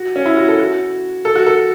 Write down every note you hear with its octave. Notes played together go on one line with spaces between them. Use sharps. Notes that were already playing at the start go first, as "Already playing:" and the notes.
Already playing: F#4
C#4
E4
F#4
A4
F#4
A4
F#4
A4